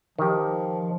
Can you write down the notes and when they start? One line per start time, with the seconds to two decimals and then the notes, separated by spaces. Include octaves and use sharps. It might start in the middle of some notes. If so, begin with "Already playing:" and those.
0.18 D#3 F3 G4